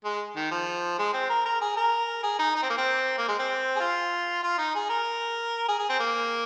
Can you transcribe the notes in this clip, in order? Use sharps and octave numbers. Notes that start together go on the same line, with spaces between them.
G#3
D#3
F3
G#3
C4
A#4
A#4
G#4
A#4
G#4
D#4
D#4
C4
A#3
C4
A#3
G#3
C4
G#4
F4
F4
D#4
G#4
A#4
G#4
G#4
C4
A#3